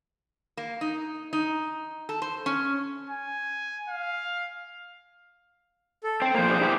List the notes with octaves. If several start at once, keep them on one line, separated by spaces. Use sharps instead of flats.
A#3
D#4
D#4
A4
C5
C#4
G#5
F5
A4
C4 C5 G5
F3 A#3 C5
D4 G#4
E4 G4 G#4